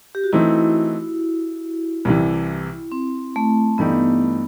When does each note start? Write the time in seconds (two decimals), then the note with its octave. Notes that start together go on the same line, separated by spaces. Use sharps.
0.15 G4
0.24 F#4
0.33 E3 A3 C4 D#4 E4
2.05 C2 C3 E3
2.92 C4
3.36 A3
3.78 G2 E3 A3 B3 D#4 G4